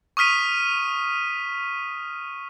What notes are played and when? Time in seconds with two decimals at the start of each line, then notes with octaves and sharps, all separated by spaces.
0.17 C#6 D#6 F6 B6 D#7